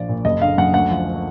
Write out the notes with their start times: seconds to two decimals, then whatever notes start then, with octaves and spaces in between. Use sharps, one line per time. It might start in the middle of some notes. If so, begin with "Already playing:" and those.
Already playing: A#1 F3 D5
0.09 A#2
0.25 F#1 D#5
0.42 D3 F5
0.58 F#2 F#5
0.74 D2 F#5
0.90 F3
1.06 D3